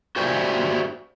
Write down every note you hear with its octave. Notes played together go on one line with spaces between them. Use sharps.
F#4 G4 C5 D5 E5 G#5